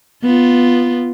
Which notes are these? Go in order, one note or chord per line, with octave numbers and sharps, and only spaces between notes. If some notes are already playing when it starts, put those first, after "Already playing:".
B3 F4